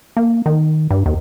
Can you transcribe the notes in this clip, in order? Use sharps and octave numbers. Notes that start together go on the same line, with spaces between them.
A#3
D#3
G2
D#2